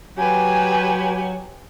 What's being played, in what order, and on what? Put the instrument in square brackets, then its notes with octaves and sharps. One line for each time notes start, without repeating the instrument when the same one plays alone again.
[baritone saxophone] F#3 [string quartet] G4 B4 G#5